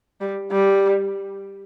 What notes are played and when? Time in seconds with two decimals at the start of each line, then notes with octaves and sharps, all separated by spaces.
0.21 G3
0.52 G3